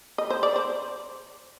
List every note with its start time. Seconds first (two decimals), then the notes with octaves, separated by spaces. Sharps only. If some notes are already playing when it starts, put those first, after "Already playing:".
0.18 D#5
0.30 C5
0.43 D5
0.56 C5